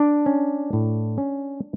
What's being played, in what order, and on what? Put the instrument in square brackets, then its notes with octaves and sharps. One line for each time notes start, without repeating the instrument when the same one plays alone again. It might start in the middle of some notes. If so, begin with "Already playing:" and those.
Already playing: [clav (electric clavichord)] D4 D5
C#4
A2
C#4